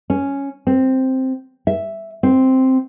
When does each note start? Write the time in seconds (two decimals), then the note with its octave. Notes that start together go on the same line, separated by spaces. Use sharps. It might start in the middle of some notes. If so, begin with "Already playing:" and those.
0.10 C#4
0.67 C4
1.67 E5
2.23 C4